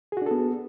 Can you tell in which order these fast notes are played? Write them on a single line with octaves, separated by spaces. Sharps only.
G#4 F#4 D4 A4 B3